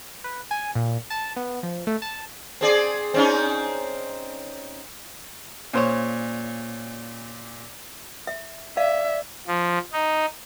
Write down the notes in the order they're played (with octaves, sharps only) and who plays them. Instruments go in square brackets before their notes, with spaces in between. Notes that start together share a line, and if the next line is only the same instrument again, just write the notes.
[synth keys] B4
G#5
A#2
A5
B3
F3
A3
A5
[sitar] C4 G#4 D5
C4 C#4 D#4
[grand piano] A#2 [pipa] C#3 C5 C#5
[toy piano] E5
[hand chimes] D5 [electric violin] E5 [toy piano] F5
[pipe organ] F3
D#4